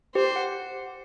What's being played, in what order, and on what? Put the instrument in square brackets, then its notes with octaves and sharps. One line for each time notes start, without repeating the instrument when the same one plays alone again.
[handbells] G4 [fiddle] C5
[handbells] F#5